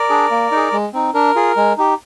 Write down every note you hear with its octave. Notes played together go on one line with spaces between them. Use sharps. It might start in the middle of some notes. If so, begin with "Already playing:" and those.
Already playing: A#4 D5
D4 G#4
A#3
D#4 G#4
G#3
C4 D#4
D4 A#4
F4 G#4
G#3
D#4 G4